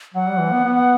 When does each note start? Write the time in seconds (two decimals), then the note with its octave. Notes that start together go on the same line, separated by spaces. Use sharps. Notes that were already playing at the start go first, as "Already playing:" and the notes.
0.15 F#3 F#5
0.27 G3
0.39 E3
0.52 B3
0.65 B3